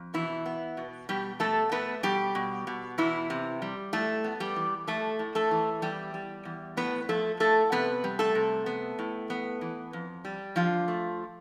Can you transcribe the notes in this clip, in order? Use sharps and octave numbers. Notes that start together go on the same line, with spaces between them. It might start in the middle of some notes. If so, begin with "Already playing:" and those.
Already playing: F2
B2 E3 E4
B3
B2
B2 G3 G4
B2 A3 A4
A3 B3 B4
B2 G3 G4
B2
B2
E2 E3 E4
C3
G3
A2 A3 A4
B3
G3 G4
E3
A2 A3 A4
A2
A3 A4
E3
E2 G3 G4
G3
E2
A2 B3 B4
F3 A3 A4
A2 A3 A4
C3 B3 B4
G3
A3 A4
C3
B3
A2
B3
E3
F2
G3
D3 F3 F4
A3